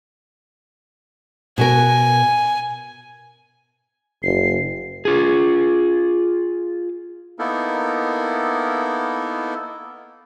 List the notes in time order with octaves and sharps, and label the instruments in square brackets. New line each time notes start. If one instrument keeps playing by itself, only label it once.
[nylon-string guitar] B2 F#4 A#4 [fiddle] G#5
[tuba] F#1 [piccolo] C7
[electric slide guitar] F4 G#4
[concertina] A#3 B3 D#4 E4 A4 A#4